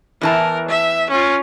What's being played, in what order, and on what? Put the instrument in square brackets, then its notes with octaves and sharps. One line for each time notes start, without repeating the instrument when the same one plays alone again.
[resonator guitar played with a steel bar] E2 E3 A5 [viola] A#4
[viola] E5
C#4 F4